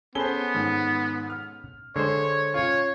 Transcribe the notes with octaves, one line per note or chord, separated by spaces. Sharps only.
B3 C#4 G#4 A4 C5 B5 G7
G#2 D#3
F6
D3 G#3 C5 C#5
C#4 F4 C#5